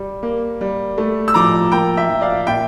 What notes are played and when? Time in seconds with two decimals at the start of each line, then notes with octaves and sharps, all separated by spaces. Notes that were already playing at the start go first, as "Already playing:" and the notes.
Already playing: G3
0.23 A#3
0.61 G3
0.98 A3
1.28 E6
1.34 F3 A#5 D6
1.72 A#3 G5 A#5
1.97 E5 G5
2.10 F3
2.21 D5 F5
2.47 A#2 E5 G5